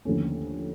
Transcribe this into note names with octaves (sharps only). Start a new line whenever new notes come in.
D#2 D3 F3 A3 C#4